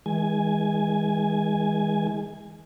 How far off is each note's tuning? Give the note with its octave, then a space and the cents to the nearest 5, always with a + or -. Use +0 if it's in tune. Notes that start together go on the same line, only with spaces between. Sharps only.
E3 -40 G#3 -20 G#5 +0